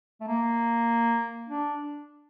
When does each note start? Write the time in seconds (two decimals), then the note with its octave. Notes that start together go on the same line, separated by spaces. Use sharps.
0.21 A3
0.28 A#3
1.49 D4